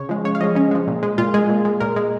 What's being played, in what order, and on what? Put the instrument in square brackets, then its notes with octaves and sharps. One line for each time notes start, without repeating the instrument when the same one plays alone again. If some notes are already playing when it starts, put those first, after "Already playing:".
Already playing: [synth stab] C#3 C#5
F3 G#3
C#3 C#5
F5
F3 G#3 D#5
C#3 C#4
F3 G#3
A#2
G#3
A#2 F4
G#3 G#4
A#2
G#3
A#2 A#4
G#3